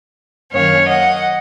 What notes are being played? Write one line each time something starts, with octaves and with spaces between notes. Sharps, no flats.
F#2 D#3 A#3 C#4 C#5 F5
D#5 F#5